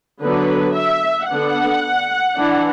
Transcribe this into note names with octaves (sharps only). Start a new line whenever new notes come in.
D3 F#3 B3 D4 B4
E5
D3 B3 D4 F#5
E3 D4